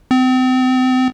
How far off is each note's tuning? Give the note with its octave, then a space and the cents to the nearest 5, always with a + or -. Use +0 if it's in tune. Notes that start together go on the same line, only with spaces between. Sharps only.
C4 -35